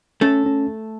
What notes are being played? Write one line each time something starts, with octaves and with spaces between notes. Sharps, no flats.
A3 C#4 A4
C#4